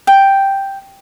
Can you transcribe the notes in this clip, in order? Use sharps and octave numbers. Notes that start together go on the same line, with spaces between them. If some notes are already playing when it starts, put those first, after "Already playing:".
G5